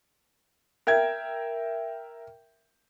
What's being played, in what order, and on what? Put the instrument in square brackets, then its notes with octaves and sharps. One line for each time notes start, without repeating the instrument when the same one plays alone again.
[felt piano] A#4 E5 G5 G#6